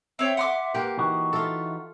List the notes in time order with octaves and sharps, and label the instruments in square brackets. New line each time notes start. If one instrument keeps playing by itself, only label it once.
[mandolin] C4 C#5 G5 [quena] E5
[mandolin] F#5 C6 D6
[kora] A#3 G4 [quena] B4
[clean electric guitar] E3 D#4 F#4
[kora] F4 A4 [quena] E5